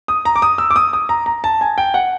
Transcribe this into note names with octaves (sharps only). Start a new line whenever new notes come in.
D#6
A#5
D6
D#6
E6
D6
D#6
D#6
A#5
A#5
A5
G#5
G5
F#5